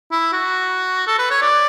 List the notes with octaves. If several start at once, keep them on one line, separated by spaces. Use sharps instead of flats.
E4
F#4
A4
B4
C#5
D5